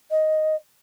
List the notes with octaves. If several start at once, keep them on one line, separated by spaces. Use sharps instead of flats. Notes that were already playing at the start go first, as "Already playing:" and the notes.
D#5